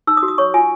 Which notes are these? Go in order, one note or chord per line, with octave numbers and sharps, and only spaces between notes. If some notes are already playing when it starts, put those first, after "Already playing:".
D#4 E6
D#6
F#4
D#6
C#5 C#6
F4 G#5